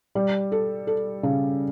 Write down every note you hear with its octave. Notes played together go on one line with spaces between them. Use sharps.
G3
A4
A4
C#3